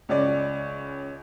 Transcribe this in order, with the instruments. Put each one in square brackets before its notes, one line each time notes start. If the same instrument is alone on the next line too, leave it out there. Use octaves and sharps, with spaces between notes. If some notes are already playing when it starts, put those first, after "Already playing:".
[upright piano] C#2 C#4 D5